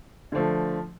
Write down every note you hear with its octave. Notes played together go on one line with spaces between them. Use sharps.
D3 F3 A3